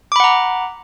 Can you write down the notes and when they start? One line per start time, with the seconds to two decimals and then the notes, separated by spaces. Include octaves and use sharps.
0.12 D6
0.16 B5
0.20 F#5
0.24 A#5